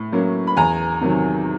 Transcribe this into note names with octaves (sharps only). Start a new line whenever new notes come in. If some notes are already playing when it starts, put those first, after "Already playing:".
Already playing: A2
F#3 A#3 C#4
B5
E2 G#5 A#5
C3 D#3 F#3